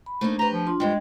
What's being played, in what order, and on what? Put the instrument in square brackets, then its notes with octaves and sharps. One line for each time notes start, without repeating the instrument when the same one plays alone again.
[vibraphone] B5
[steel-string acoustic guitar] A3 A#3 D#4 [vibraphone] D4 C5
[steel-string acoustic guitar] G4 B4 [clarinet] A#5
[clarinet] F3
[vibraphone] D4 F4 C6
[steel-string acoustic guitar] G2 F3 G4 [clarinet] G#3 [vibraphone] D4 G5